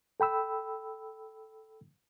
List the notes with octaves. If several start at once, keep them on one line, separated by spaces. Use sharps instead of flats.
A4 G5 B5 E6